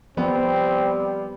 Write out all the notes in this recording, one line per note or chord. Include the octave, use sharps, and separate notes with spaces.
F3 G3 B3 C4